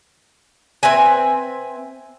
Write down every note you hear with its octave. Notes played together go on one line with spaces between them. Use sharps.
C4 B4 E5 G#5